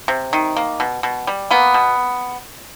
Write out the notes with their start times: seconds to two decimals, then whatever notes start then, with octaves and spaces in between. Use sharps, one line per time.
0.08 C3
0.33 D#3
0.57 A#3
0.80 B2
1.03 B2
1.27 G3
1.51 A#3 B3
1.74 B2